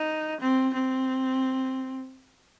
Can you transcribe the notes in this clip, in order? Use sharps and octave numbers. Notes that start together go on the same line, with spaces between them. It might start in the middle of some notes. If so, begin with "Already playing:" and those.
Already playing: D#4
C4
C4